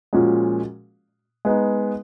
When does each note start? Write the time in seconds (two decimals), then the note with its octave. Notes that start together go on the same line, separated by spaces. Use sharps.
0.13 A#2 F3 G#3 C#4 F#4
1.45 G#3 B3 D#4